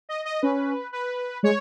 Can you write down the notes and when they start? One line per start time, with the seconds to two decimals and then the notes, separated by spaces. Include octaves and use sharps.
0.09 D#5
0.25 D#5
0.42 C#4 B4
0.93 B4
1.43 G#3 C#5